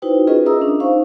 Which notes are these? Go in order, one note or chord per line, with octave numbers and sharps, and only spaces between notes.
D#4 E4 F#4 B4 C5 G5
C#4 F4 G#4 A#4 B4 D#5
G#4 A#4 E5 A#5 D#6 E6
C#4 D4
D#4 C5 F5 C#6